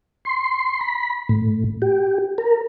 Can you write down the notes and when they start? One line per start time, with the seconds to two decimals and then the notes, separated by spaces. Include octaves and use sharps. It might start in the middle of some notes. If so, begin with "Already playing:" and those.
0.25 C6
0.81 B5
1.29 A2
1.82 G4
2.38 A#4